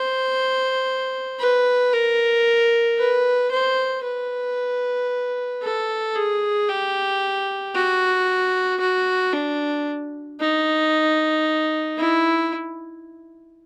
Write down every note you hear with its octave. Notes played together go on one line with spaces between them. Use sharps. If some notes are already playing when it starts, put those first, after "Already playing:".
Already playing: C5
B4
A#4
B4
C5
B4
A4
G#4
G4
F#4
F#4
D4
D#4
E4